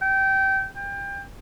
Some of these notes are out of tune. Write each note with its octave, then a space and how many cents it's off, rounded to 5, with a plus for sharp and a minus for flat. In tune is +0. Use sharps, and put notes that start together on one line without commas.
G5 -20
G5 +25